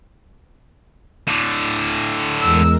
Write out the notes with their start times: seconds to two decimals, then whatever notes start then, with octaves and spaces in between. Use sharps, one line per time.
1.28 A2 D3
2.42 E2 G#3 A#4 E6